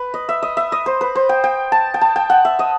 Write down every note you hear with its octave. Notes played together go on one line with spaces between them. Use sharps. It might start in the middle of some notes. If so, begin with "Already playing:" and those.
Already playing: B4
D#5
E5
D#5
E5
D#5
C5
B4
C5
G5
G5
A5
G5
A5
G5
F#5
E5
D#5